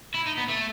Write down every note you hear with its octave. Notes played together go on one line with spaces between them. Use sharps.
E4
D#4
B3
A3